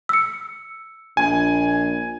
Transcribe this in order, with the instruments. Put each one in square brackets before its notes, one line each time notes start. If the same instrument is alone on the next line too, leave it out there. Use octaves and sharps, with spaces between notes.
[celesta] E6 C#7
[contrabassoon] A#1 [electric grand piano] G#5